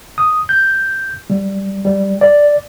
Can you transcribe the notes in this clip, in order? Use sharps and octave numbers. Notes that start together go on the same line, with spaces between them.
D#6
G6
G3
G3
D5